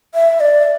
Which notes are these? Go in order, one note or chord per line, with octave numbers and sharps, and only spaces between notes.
E5
D5